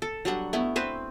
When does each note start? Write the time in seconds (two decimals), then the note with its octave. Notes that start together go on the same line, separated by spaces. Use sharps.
0.02 A4
0.25 F#3 G3 D4 F#5
0.53 A3 B3 E4
0.76 C4 B4 C5